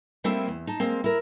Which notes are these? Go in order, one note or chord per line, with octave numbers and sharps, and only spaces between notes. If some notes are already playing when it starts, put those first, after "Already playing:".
G3 A3 A#3 C4 E4
E2
D#4 A5
G#3 A#3 C4
E4 A#4